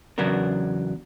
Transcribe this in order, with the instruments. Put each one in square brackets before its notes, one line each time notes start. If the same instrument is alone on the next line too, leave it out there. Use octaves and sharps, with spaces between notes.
[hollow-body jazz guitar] E2 C#3 F#3 B3 D4 A#4